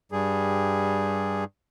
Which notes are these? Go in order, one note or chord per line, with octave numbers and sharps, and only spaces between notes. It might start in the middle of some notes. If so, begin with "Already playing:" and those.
G2 G3 G#4